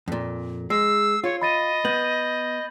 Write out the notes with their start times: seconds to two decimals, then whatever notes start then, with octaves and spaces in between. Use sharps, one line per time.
0.08 F2 A#2
0.70 G#3 E6 C7
1.24 F4 C#5
1.42 D#5 B5 A6 D#7
1.85 B3 G6 F#7